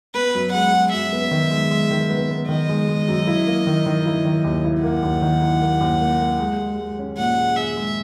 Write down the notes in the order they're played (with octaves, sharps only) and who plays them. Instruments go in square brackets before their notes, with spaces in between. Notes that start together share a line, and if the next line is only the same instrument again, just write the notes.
[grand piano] B3 [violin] B4
[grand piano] F#2
[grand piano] G#3 [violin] F#5
[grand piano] G#3
[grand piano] F#2 [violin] E5
[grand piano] B3
D#3
G#3
G#3
D#3
B3
B3
[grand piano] D#3 [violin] D#5
[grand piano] G#3
G#3
F#2
E4
A#3
D#3
D#3
E4
D#3
D#2
E4
[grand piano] A#3 [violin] F#5
[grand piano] D#2
D#3
E4
A#3
D#2
A#3
A#3
G#3
G#3
G#3
C#4
[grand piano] A#2 [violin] F#5
[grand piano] G#4
[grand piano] G#4 [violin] E5
[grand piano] G#3